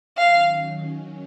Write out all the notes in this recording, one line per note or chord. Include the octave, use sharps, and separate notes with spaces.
D#3 F#3 C#4 F5